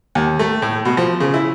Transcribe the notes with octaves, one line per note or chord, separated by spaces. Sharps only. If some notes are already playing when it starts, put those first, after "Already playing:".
D#2
A3
A2
B2
F3
C#3
E4